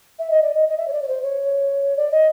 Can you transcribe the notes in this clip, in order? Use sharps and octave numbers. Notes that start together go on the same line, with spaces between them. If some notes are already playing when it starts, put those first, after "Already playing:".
E5
D#5
D5
D#5
D#5
E5
C#5
D5
C#5
C5
C#5
D5
D#5